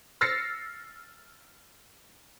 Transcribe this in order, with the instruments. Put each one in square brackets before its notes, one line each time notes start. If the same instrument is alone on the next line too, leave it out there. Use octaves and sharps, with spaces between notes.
[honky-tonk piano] E6 F6 A6 A#6 C7 C#7